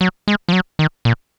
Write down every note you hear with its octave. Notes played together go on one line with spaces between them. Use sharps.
F#3
G#3
F3
F#3
D#3
A#2